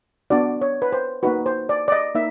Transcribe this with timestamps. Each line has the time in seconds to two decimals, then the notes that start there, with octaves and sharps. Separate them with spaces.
0.30 B3 D4 F#4 D5
0.61 C#5
0.82 B4
0.92 C5
1.23 A#3 D#4 F#4 B4
1.46 C5
1.69 D5
1.88 D5
1.92 D#5
2.15 A#3 D#4 E5